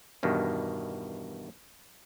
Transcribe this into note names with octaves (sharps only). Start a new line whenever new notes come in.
E2 G2 B2 D#3